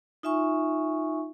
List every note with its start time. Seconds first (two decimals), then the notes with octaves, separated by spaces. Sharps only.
0.23 D#4 F4 E5 G#5 C#6